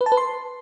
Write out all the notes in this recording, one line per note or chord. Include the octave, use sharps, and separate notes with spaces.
B4
A5
B4
C6